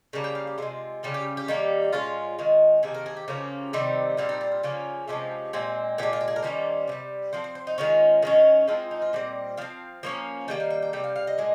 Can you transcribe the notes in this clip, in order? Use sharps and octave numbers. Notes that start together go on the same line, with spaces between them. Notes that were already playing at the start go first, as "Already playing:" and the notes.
C#3 G3 A#3
G5
F5
G4
C3 D#3 G#3 F4
C#3 G3 C#4 F4
G4
G4
D#3 G3 A#3
A#2 G#3 C#4 F4
D#3 G#3 C#4
C3 D#3 A#3 G#4
A#4
G#4
G4
C#3 F3 A#3 C#4 G4
C3 D#3 G3 C4
A#2 G3 C4 F4
D#4
F4
F4
C#3 F3 A#3 C#4
C3 F3 G#3 C#4 G4
A#2 G#3 C4
A#2 F3 G#3 G4
F4
G4
G#4
A#4
D#3 G3 A#3 C#4 C5
C3 D#3 G3
F3 C4 C5
C5
C5
D#4
D#3 G#3 C#4 F4
D#3 G#3 C#4
F3 G#3 C4 F4
D#4
F4
A#2 G3 C4 D#5
F3 C4 F5
F3 A#3 C#4
D#3 G3 A#3 G5
F5
G5
G5
C3 G3 G5
F5
F5
D#5
A#2 G#3